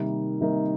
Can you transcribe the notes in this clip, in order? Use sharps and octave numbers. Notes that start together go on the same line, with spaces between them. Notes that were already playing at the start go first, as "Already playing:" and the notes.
Already playing: C3 D#3 G3 A#3 D#4
C3 D#3 G3 A#3 D#4